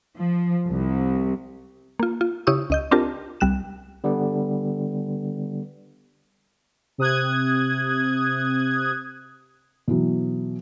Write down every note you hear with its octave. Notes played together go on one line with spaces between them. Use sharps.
F3
C2
A#3 F4
F4
C#3 E4 G4 C#6 D#6 E6
C#2 D#5 G6
C4 D4 F4 G4 A#4 A5
C2 G3 F#6 E7
D3 G3 B3
C3 D#6 F#6 G#6
B2 E3 F#3